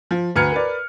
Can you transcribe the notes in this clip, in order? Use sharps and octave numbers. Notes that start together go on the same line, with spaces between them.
F3
D2 B4 A#5 F6 G#6 C#7
A#4 B4 D5